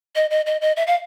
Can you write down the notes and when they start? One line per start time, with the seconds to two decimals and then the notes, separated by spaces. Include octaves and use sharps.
0.15 D#5
0.31 D#5
0.46 D#5
0.62 D#5
0.77 E5
0.87 F5